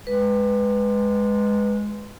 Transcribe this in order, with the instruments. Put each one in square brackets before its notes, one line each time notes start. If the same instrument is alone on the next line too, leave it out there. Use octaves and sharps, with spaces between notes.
[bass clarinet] G#3 [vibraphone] B4